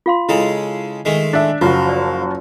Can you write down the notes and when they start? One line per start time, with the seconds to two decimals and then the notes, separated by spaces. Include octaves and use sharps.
0.06 F4 F5 C6
0.29 C#3 G#3 E4 A4
1.05 D#3 G#3 A3
1.33 D4 E5
1.61 F#1 F3 F4 F#4
1.89 D5